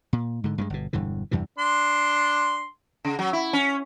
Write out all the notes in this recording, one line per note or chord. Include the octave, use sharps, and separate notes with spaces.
A#2
G#2 D3
G2 G3 G#3
G1 B2
E1 G2 D3 E3
E2 G2 C3 E3
D4 C6
C#3
F#3
E4
C#4